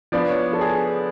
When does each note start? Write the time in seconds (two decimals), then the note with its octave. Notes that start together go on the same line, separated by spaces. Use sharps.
0.12 F3 B3 D4 D5
0.28 C#5
0.53 A4
0.61 G#4